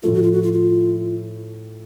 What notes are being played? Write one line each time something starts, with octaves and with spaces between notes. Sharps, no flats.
A2 F3 A3 F4
F#4
F4
F#4
F4
F4